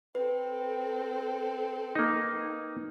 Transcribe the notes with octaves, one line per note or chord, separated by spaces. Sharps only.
C4 A4 B4
A#3 D#4